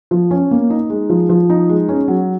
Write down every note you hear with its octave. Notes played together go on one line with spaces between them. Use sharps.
F3
C#4
A#3
D#4
G#3
F3
F3
D#4
G#3
C#4
F#3